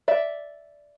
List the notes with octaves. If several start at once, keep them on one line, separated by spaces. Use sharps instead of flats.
D5 E5